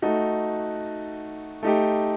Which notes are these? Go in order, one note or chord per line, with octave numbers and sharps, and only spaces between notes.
A3 D#4 F#4
A3 D#4 G4